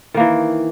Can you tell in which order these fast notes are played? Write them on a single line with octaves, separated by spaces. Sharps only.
D#3 A#3 E3